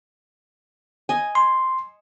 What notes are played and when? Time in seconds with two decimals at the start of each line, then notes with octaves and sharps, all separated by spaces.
1.09 D#5 G#5
1.35 C6